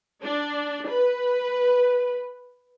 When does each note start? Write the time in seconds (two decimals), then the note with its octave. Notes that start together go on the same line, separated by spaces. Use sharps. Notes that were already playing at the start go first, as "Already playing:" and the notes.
0.24 D4
0.89 B4